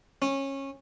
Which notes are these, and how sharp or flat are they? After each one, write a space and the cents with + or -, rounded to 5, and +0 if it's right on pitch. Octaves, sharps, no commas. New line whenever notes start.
C#4 -20